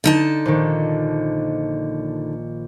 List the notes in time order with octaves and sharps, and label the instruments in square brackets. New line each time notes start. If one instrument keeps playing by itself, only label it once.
[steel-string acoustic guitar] D3 D#4 A5
[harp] A#1 D#3